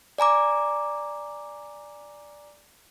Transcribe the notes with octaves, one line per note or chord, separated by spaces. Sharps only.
D5 G#5 A#5 D6